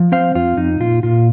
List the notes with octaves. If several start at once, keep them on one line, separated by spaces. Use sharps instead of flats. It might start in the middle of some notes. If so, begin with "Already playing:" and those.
Already playing: F3
C4 C5 F5
F2 F4
F2 D#4
A#2 F4
A#2 F4